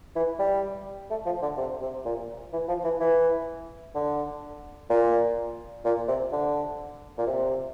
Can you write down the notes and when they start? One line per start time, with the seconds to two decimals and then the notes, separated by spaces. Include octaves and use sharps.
0.16 E3
0.39 G3
1.11 A3
1.26 F3
1.42 D3
1.57 C3
1.81 C3
2.05 A#2
2.53 E3
2.68 F3
2.84 E3
3.00 E3
3.95 D3
4.90 A#2
5.85 A#2
6.08 C3
6.32 D3
7.18 A#2
7.27 C3